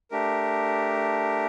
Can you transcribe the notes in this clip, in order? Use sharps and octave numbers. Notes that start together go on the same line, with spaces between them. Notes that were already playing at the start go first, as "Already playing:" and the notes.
A3 D4 G4 A#4